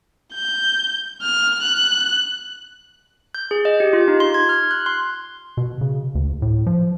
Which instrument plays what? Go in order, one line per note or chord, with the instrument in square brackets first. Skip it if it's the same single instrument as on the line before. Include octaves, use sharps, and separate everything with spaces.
[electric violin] G6
F6
F#6
[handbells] G6
G#4
D#5
G4
F4
D#4
C6
G#6
F6
F#6
C6
[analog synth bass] B2
C#3
D2
A2
F3